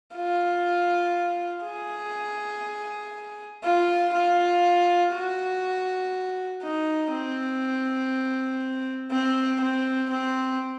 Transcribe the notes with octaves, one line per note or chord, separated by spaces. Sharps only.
F4
G#4
F4
F4
F#4
D#4
C4
C4
C4
C4